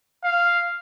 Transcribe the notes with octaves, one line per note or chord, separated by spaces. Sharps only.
F5